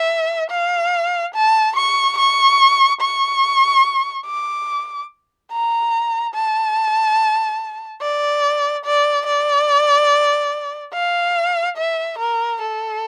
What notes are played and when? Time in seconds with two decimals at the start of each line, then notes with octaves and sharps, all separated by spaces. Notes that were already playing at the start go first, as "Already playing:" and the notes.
Already playing: E5
0.51 F5
1.35 A5
1.77 C#6
2.18 C#6
3.01 C#6
4.27 D6
5.52 A#5
6.35 A5
8.02 D5
8.86 D5
9.27 D5
10.94 F5
11.78 E5
12.19 A#4
12.62 A4